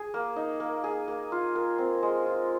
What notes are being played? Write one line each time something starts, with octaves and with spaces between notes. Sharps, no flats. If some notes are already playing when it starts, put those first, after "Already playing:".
Already playing: G#4
A#3
D#4
A#3
G#4
A#3
F4
A#4
C4
G#3
F4